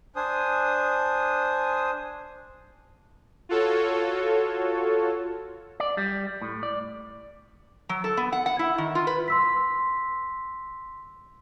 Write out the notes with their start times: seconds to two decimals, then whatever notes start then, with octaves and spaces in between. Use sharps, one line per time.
0.16 D4 C5 G#5 D#6
3.49 F4 F#4 A4 C#5
5.80 D5
5.97 G3
6.42 A2
6.63 D5
7.89 F#3
8.04 A4
8.17 B3
8.32 F#5
8.46 F#5
8.59 E4
8.78 D#3
8.95 F4
9.07 B4
9.28 C6 E6 B6